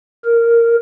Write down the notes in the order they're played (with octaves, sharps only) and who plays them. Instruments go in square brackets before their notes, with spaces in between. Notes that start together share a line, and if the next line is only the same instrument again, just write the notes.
[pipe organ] A#4